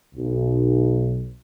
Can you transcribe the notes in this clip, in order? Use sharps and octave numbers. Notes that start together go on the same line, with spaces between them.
B1